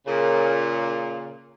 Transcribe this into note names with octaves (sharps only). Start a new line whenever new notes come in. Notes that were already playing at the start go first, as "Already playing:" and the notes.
A#2 C#3